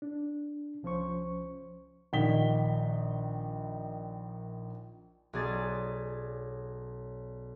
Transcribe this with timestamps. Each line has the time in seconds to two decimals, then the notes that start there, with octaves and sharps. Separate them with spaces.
0.02 D4
0.83 C2 F3 C#4 C5 C#6
2.13 A#1 D#3 D#4 B6 G7
5.33 B1 C#4 G#4 D5 A6